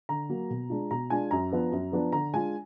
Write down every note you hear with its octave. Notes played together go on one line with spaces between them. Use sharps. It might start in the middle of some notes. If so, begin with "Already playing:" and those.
D3 A#5
F#3 A#3
B2
G#3 D4 F4
B2 A#5
G#3 D4 F4 G#5
F#2 A#5
F3 B3 D4
F#2
F3 B3 D4
D3 A#5
G#3 D4 F4 G#5